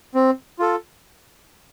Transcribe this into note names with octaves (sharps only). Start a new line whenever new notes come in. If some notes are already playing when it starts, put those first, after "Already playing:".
C4
F4 A4